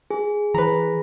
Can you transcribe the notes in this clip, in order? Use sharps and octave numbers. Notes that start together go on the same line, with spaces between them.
G#4
E3 B4 A#5